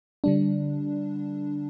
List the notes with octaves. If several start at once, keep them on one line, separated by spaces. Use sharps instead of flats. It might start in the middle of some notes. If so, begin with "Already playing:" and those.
D3 G3 D4